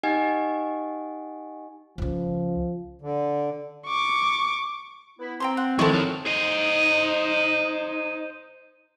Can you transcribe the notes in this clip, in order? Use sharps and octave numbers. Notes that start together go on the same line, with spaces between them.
D#4 G4 D#5 F#5 G#5
C#2 C#3 F3
D3
C#6 D6
B3 E4
C4 G5 A#5 C6
F#5
D#3 F3 G#3 E4 A4 C6 C#6
A#4 C#5
D#4 C5 D#5